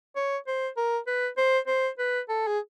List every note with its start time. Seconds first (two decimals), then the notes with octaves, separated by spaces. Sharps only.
0.16 C#5
0.47 C5
0.77 A#4
1.07 B4
1.38 C5
1.68 C5
1.99 B4
2.29 A4
2.47 G#4